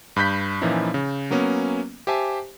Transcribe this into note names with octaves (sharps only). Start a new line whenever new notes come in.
G2 B5 F#6 G6 B6
A#2 E3 F3 C#4 D#4 E4
C#3
F#3 A#3 B3 C#4
G4 C5 E5 G#5 A5